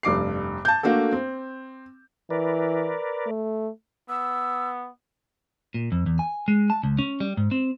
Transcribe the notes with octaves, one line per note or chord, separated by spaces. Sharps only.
F1 G2 D6 C7
A5 G6
A3 A#3 D4 F#4 A4
C4
E3 A#4 B4 D5
A3
B3 E6
A#2
F2
E2
G#5
G#3
A5
C#2
C#4
G3
G#2
C4